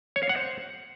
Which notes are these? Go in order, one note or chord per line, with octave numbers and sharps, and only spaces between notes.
C#5
F5
F#5
C5